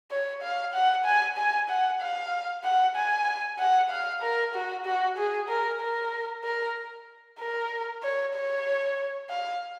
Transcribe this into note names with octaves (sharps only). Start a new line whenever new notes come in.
C#5
F5
F#5
G#5
G#5
F#5
F5
F#5
G#5
F#5
F5
A#4
F#4
F#4
G#4
A#4
A#4
A#4
A#4
C#5
C#5
F5